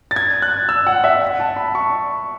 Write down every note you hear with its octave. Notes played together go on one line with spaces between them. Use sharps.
A6
G#6
F#6
E6
F#5
E5
F#5
A5
B5
C#6